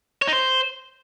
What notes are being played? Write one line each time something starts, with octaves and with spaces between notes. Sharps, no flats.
C#5
D#4
C5